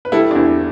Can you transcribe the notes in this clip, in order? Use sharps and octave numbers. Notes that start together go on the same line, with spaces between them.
B4
G3 E4 A4
D4
E2 E4